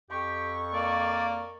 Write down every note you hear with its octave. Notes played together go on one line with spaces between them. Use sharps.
F2 G4 C#6
A#3 D5